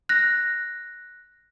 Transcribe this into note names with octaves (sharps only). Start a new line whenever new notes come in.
F#6 A#6